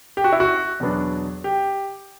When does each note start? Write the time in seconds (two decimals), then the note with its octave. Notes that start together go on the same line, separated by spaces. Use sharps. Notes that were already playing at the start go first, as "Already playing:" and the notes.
0.17 G4
0.24 F#4
0.32 E4
0.40 F#4
0.80 E2 B2 F#3 B3 D4
1.44 G4